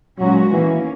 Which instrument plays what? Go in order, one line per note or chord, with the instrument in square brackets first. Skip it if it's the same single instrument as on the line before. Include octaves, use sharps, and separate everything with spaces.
[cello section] A#2 G#3 C#4 F#4 [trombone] F#3
[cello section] D#3 A#3 C#4 [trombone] E3